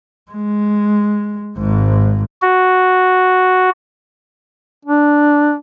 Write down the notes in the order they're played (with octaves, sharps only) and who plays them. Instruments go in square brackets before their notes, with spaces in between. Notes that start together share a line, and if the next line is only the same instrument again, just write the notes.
[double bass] G#3
G#1 G#2
[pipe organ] F#4
[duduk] D4